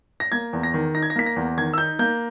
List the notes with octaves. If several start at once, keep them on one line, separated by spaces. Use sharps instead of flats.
A#6
A#3 G#6
E2
A#6
D#3
D#4 A#6
G#6
A#6
A#3 B6
A#6
E2
D#3 G#6
E6
D#4 G6
A#3 G6